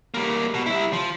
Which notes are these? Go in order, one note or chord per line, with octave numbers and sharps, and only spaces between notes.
G3 A#3
B2
G3 E4
F3